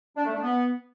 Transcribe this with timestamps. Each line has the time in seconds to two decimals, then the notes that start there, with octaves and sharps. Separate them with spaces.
0.17 D4
0.25 A3
0.34 D4
0.43 B3